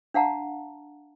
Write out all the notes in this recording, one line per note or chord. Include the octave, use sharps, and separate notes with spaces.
D4 F5 F#5 A5 A#5